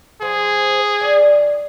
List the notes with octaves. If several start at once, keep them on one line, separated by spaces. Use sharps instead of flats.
F3 G#4 C5
D#3 D5